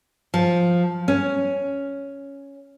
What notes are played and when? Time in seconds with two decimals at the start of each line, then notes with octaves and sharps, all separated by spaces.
0.34 F3
1.08 C#4